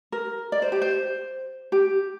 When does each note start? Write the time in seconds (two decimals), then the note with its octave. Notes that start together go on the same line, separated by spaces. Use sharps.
0.12 A#4
0.52 D5
0.62 C5
0.72 G4
0.82 C5
1.72 G4